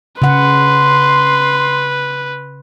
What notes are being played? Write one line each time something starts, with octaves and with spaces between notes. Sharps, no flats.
C#3 B4 F#5 C6